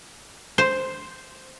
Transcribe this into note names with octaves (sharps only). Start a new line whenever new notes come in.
C5